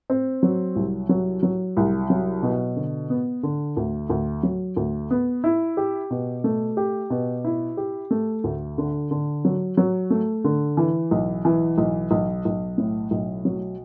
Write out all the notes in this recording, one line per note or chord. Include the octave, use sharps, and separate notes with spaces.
C4
F#3
C2
F#3
F#3
C2
F#3
B2
D3
B3
D3
D2
D2
F#3
D2
B3
E4
G4
B2
A3
G4
B2
E4
G4
A3
D2
D3
D3
F#3
F#3
A3
D3
E3
B1
E3
B1
B1
B1
A2
B1
F#3